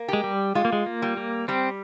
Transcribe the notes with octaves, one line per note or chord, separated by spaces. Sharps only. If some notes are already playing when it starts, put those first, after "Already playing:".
Already playing: A#3
G#3 G4
G3
G#3 F4
A#3
G#3
A#3
G3
A#3
G3 C4